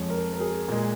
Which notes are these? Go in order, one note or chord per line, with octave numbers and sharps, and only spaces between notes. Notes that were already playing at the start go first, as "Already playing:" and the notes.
Already playing: F2 F3 G#3 C#5
A#4
A#4
G#4
A#2 G#3